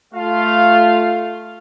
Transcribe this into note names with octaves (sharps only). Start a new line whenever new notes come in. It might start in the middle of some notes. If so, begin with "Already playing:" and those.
A3 F4 F5